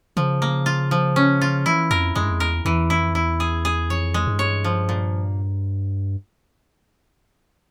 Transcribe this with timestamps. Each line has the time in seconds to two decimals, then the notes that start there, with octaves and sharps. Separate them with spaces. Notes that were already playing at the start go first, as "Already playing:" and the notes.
0.17 C#3 F3
0.42 A#3
0.66 F4
0.91 F3
1.16 C#4
1.41 F4
1.66 E3 E4
1.91 F2 A#4
2.15 F2 G#3
2.23 G2
2.31 F2
2.40 E2 A#4
2.65 E2 E3
2.90 F2 E4
3.15 E2 E4
3.40 G#4
3.65 G#4
3.90 F2 C#5
4.14 G#3
4.27 G2
4.39 C#5
4.64 F3
4.89 A#2